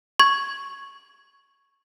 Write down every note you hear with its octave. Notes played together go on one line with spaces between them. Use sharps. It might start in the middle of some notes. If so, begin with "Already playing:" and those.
C#6 G#6